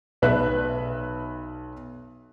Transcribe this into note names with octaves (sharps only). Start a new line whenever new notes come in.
B1 B4 E5 F#6